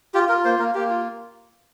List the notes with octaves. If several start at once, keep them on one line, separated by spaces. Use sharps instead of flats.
F4 G4
F4 A#4
A#3 C5
A#3 A#4
A#3 G4
F4